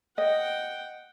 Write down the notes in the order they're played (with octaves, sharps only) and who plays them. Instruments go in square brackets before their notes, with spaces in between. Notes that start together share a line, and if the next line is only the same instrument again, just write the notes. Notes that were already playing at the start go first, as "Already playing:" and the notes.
[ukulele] D#5 [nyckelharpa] F#5 G5